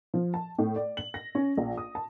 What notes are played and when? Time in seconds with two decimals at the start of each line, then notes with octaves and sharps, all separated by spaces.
0.14 F3
0.34 A5
0.58 A2
0.76 D5
0.97 F#7
1.14 A#6
1.35 C#4
1.57 A#1
1.77 D#6
1.95 A5